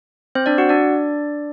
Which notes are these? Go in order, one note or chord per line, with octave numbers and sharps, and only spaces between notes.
C4 C5
D4 D5
F#4 F#5
D4 D5